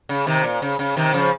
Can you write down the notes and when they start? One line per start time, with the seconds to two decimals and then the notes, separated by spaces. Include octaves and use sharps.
0.09 C#3
0.27 C3 D#3
0.44 A#2
0.62 C#3
0.79 C#3
0.96 C3 D#3
1.14 C#3 F3